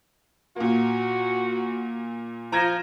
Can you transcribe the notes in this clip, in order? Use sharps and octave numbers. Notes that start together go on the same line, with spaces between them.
A#2 A#3 F#4
F3 A#5 G#6 A#6